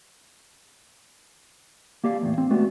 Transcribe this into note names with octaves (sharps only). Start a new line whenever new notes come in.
A#3 G4 D5 F5
E2 A2
C4
G#3 A3 B3 D4 F#4 G4